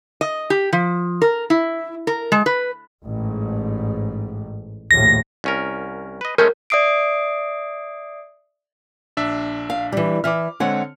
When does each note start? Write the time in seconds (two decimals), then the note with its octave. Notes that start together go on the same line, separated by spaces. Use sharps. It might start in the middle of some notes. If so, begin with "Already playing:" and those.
0.21 D#5
0.50 G4
0.73 F3
1.22 A#4
1.50 E4
2.07 A#4
2.32 G#3
2.46 B4
3.05 A1 G#2
4.91 A#1 D#2 A2 A#6
5.44 C2 C#4 A#4
6.21 B4 D#5
6.38 G#3 A3 C#4 A#4 G6
6.70 D5 E5 D#6 C7 D7
9.17 A#1 D4 E5
9.70 F5
9.92 E3 G3
10.24 E3 E5 D6 F6
10.60 D3 G#3 C4 C#5 F#5